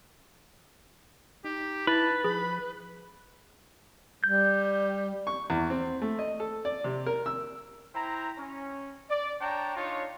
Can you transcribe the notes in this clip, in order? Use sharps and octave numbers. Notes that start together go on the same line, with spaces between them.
D#4 G4
E4 B4 A5
F3 G#4 B5
G3 G6
C#6
E2
C4
A3
D#5
A4
D5
C3
A#4
E6
E4 C5 G5 A#5
C#4
D5
D4 C#5 D5 G5 A5 A#5
D4 D#4 F4 C#5